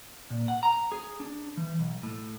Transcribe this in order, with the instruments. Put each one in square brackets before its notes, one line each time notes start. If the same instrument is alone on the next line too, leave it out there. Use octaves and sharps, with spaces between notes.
[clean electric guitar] A#2
F#5
A#5
G#4
D4
E3
B1
A2